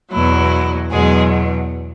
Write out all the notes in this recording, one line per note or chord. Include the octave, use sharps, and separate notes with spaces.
E2 B2 F#3 E4
E2 B2 F#3 G#3 G#4